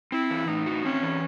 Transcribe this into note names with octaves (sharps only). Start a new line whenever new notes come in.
C4 E4
E3
A2 D#4
F#4
C4 C#4
E3